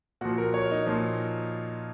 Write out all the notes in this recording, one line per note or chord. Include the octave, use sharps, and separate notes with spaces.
A#2 F3 F#4
A#4
C#5
D#4
A#2 F3